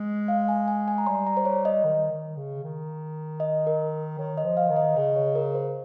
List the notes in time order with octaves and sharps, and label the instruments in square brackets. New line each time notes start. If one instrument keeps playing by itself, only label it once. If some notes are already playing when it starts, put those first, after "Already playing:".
Already playing: [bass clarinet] G#3
[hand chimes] F5
G#5
G#5
G#5
A#5
[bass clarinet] G3 [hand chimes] C6
[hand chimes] A#5
C5
C#5
D#5
[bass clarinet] D#3
D#3
C#3
D#3
[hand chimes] D#5
A#4
[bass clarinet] D#3 [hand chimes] C#5
[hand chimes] D#5
[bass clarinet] F3
[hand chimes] F5
[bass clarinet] D#3
[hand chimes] D#5
[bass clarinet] C#3 [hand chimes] D#5
[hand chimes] C#5
A#4
C5